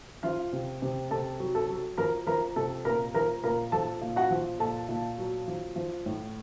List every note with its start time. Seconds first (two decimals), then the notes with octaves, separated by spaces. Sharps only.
0.23 F3 F4 F5
0.53 C3
0.82 C3
1.11 C3 A4 A5
1.40 F#3
1.55 A4 A5
1.69 F#3
1.98 F3 A#4 A#5
2.27 F3 A#4 A#5
2.56 C3 A4 A5
2.85 A#2 A#4 A#5
3.14 F3 A#4 A#5
3.44 A#2 A#4 A#5
3.72 F3 A4 A5
4.01 A#2
4.16 F#4 F#5
4.31 F3
4.60 A#2 A4 A5
4.89 A#2
5.18 F#3
5.48 F3
5.76 F3
6.06 A2